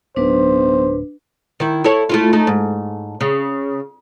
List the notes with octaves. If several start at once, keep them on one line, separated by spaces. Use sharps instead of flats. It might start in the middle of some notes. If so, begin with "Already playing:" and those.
D1 B1 D4 B4 C5
D#3 E4
E4 A4 C#5
A3 E4 F4
A3 D#4
G#2
C#3